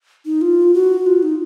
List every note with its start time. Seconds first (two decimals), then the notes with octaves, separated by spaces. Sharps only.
0.26 D#4
0.41 F4
0.74 F#4
1.06 F4
1.23 D#4